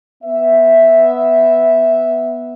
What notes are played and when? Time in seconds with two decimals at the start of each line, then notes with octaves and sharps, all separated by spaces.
0.24 B3 E5